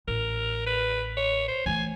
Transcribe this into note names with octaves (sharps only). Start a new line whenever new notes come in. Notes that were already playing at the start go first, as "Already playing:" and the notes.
A1 A#4
B4
C#5
C5
E3 A3 G#5